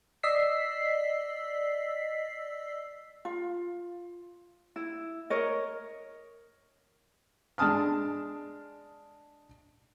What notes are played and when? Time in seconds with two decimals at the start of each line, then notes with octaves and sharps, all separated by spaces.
0.23 D5 D#5 E6 B6 C7
3.25 F4
4.76 E4
5.30 A#4 C#5 D#5
7.58 G#3 D4 A5 D#6 F6